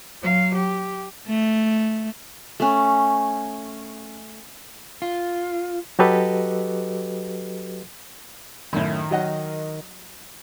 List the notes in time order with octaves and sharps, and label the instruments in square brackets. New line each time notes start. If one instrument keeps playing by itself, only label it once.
[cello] F#3 F5
G4
[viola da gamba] A3
[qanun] A3 C#4
[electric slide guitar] F4
[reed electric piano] F#3 F#4 G4 A4 B4 D#5
[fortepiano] F#2 A2 [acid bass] D#3
[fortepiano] F#3 D#5 F#5